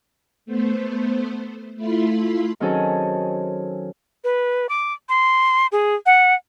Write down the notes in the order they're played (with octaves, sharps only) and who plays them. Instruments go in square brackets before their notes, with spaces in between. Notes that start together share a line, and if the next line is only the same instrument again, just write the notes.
[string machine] A3 B3 C5
A3 E4 F4 B5 C6
[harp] D#3 F#3 C4 C#4 G#4 A4
[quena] B4
D6
C6
G#4
F#5